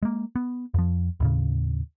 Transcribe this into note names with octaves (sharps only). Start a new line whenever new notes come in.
G#3 A#3
B3
F2 F3
D#2 A2 C#3